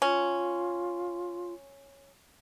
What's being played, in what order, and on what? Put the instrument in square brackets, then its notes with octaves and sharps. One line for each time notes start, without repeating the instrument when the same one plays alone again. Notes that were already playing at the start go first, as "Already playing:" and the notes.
[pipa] C#4 [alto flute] F4